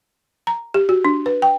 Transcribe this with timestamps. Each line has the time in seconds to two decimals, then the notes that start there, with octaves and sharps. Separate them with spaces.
0.47 A#5
0.74 G4
0.89 F#4
1.05 D4
1.26 B4
1.42 G5